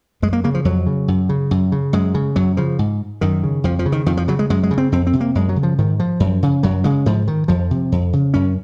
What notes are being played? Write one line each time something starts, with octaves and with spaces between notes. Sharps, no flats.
F#2 G#3
A#3
C#3 A#3
F3
F2 F#3
C#3
F#2
C#3
F#2
C#3
F#2 G#3
C#3
F#2 F#3
C#3 F3
G#2
F#2 D#3
C#3
F2 F3
F3
C#3
D#3
F2 D#3
F3
C#3 F#3
G#3
F#2 G#3
G#3
C#3
C4
F2 C4
C4
C3
A#3
F#2 G#3
F#3
C#3
F3
G#2 D#3
F3
F#2
C#3
F#2 F#3
C#3 G#3
G#2 F3
D#3
F2 F3
C3
F2
C#3
F#2 C#4